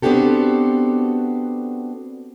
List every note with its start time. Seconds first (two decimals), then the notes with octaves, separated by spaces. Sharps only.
0.02 B3 C4 D4 F#4 G4 A4